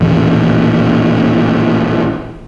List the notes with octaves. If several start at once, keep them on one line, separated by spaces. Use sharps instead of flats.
A1 D#2 A#2